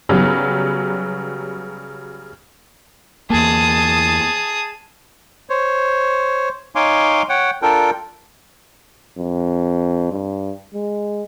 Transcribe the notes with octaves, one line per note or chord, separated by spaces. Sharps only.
C#3 F#3 G3 B3
E2 A#3 G#4 A5 D#6
C5 C#5
D#4 C#5 F5 G#5 C6 D6
C#5 F#5 G5
D4 F4 A4 A#4 G5
F2
G2
G#3